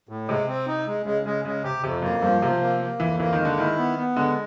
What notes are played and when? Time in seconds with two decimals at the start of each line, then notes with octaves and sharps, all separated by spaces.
0.09 A2
0.28 C3 G#3
0.48 C4
0.67 D#4
0.87 G#3
1.06 C#3 G#3
1.26 C#3 G#3
1.45 C#3 G#3
1.64 C3 G4
1.83 F2 C3
2.02 F#2 A#3
2.22 G2 F3
2.42 C3 F3
2.61 A#3
2.81 A#3
3.00 F2 E3
3.19 E3 A#3
3.33 D#3
3.39 G#3
3.45 D3
3.58 D#3 E4
3.78 B3
3.97 B3
4.16 D3 G#3